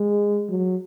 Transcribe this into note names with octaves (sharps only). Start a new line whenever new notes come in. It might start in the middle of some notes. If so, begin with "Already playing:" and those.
Already playing: G#3
F#3